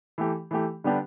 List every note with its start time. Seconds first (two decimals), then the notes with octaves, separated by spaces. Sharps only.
0.18 E3 A3 G4
0.51 E3 A3 G4
0.84 D3 G3 B3 D4 G4